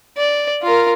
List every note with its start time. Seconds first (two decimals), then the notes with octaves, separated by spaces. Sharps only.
0.17 D5
0.63 F4 A#4